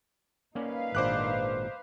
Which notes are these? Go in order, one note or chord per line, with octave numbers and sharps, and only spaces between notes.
A#3 C#4 D#4 B4 D5 F5
G#1 A#2 D4 C5 D6 F#6